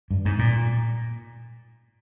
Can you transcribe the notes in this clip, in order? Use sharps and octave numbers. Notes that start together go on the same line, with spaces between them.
G2
G#2
A#2